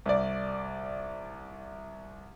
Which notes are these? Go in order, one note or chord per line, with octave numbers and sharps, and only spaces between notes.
C2 D5